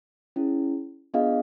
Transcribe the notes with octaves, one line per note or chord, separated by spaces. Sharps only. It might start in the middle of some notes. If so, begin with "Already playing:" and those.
C#4 E4 G#4
B3 D4 F4 G#4 D#5 F5